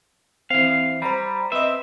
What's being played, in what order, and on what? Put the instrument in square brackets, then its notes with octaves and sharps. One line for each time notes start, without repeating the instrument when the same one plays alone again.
[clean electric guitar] E3 F5 [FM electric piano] C4
[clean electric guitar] G3 [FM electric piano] C5 A#5 B5
[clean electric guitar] C4 E5 [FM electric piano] B4 D#5